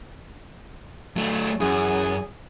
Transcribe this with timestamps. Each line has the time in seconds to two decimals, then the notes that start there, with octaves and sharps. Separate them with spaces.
1.17 F#3 A3
1.60 F#2 E3 G#4